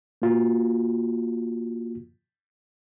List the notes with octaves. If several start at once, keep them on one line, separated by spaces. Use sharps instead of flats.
A#3 F4 F#4